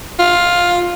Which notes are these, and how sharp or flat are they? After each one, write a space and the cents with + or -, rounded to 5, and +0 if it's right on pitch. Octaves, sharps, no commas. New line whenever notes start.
F4 +10